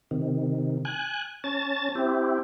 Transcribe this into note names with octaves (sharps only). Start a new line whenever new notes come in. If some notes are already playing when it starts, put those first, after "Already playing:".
C3 D#3
G#5 F#6
C#4 A5 A6
C4 E4 G4